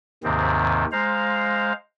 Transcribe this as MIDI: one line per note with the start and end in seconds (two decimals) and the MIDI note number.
0.23 0.85 39
0.23 0.85 44
0.23 0.85 48
0.23 0.85 51
0.23 0.85 60
0.92 1.73 56
0.92 1.73 72
0.92 1.73 77
0.92 1.73 82